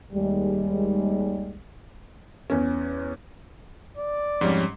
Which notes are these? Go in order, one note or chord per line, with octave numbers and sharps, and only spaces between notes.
D#2 G3 G#3
E2 C#4
D5
F2 G#2 G3 C#4